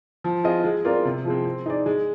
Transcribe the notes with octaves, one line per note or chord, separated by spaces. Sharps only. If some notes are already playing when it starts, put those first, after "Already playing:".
F3
C4 F4 G#4 D#5
G#3
C4 F4 A#4 D5
C3
F3 G#3 C4
C4
D#4 G#4 D5
G#3